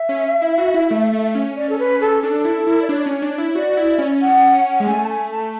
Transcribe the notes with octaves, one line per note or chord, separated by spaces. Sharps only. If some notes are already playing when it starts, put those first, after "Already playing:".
Already playing: E5
C#4
E4
F#4
E4
A3
A3
C#4
C#4 D5
A4
B4
A4
D4 A4
E4
E4
D5
D4 C#5
C#4
D4
E4
F#4 D5
E4
C#4
F#5
G#3
A3 G#5
A5
G#5
A5